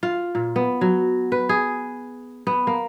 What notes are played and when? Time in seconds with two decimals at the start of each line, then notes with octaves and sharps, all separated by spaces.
0.03 F4
0.35 A#2
0.56 B3
0.81 F#3
1.32 B4
1.49 G#4
2.47 B3
2.67 A#3